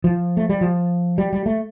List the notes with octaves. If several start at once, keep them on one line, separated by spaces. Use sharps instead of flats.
F3
A3
G3
F3
G3
G3
A3